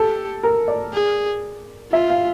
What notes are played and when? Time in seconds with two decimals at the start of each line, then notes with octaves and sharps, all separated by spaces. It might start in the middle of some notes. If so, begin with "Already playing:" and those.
Already playing: G4 A4
0.43 A#4
0.68 D5
0.93 G#4
1.92 F4 E5
2.10 F5